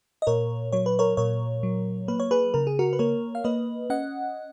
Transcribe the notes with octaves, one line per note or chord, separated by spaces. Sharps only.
D#5
A#2 A#4 C#5
F#3 C#5
B4
A#4 C#5
A#2 A#4 C#5
F#3
A#3 B4
C#5
G#4 B4
C#3 A#4
G#4
F#4 A#4
B4
A#3 A#4 C#5
F5
A#3 B4 D#5
C#4 D#5 F#5